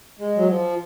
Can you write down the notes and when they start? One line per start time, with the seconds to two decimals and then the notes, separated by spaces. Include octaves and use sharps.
0.19 G#3
0.37 F#3
0.49 F3